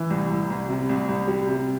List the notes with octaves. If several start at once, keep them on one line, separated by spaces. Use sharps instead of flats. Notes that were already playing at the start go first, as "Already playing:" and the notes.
Already playing: E3
C2
C2
C2
C3
C2
C2
G3
C3